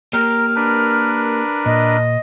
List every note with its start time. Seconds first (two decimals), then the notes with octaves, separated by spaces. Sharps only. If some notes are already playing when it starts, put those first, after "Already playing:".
0.13 A#3 G4 A#4 F6
0.56 D4 A#4 B4
1.66 A#2 D#5